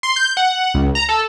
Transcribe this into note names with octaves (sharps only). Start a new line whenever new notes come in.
C6
G6
F#5
C#2
A#5
A4